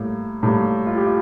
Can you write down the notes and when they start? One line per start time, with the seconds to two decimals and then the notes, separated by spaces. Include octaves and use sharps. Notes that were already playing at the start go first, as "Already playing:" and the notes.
Already playing: A2 G3 A#3
0.43 A2 G3 A#3
0.86 F4
0.97 G4
1.06 F4